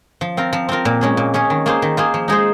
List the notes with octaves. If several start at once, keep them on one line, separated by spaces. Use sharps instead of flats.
F3
C4 F4 A#4
F3
C4 F4 A#4
A#2
G#3 C#4 G#4
A#2
G#3 C#4 G#4
D#3
A#3 F4 G#4 C5
D#3
A#3 F4 G#4 C5
F3
G#3 D#4 G#4 C5